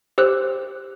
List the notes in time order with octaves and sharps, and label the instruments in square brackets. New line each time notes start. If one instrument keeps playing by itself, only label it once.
[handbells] G4 C5 E6 F#6